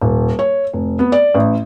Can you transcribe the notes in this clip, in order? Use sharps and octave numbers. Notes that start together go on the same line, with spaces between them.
D#1
C#5
F1
B3
D5
A1